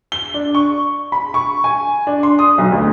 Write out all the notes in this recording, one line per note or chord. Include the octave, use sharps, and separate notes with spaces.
G7
D4
C#6
B5
C#6
G#5
D4
C6
D#6
B1
D2